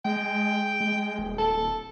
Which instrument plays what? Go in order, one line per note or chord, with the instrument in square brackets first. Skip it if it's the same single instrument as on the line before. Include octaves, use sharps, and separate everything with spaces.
[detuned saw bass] G#3 [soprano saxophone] G5
[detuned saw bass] G#3
D#1
[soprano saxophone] A4